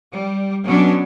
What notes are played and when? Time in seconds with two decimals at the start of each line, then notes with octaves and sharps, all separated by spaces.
0.13 G3
0.65 B2 F#3 B3 C#4 D4